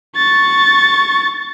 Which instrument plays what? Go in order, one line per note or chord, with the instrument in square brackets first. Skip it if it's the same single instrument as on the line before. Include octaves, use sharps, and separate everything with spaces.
[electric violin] C#6 A6